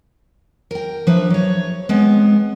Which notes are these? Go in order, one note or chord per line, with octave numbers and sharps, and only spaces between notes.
A#4 G5
F3 D4 B4 E5 A#5
F#3 C#5
G#3 B3 C4